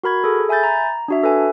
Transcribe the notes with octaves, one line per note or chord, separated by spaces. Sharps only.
F#4 A#4 B5 G#6
G#4 A4
E5 G#5 B5 G6 A6
A#5
D4 F#4 E5
A4 B4 G#5